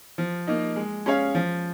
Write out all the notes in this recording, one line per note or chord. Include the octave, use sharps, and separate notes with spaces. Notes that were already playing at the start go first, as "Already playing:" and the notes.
F3
A#3 D#4
G#3
C#4 G#4 C#5 F5
F3